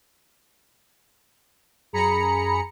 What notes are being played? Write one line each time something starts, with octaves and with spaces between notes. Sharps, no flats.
F#2 G#4 A#5 B5 C#7